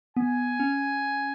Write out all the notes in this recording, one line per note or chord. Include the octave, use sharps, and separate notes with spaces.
B3 G#5
C#4